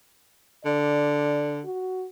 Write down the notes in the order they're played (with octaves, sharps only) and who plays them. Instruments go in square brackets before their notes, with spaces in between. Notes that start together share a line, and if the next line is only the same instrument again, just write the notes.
[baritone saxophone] D3 [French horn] D5
[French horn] F#4